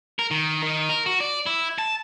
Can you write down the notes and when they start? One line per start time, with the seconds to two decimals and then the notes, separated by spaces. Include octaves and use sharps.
0.19 A#4
0.31 D#3
0.63 D#3
0.89 A#4
1.06 F#4
1.20 D5
1.46 E4
1.78 A5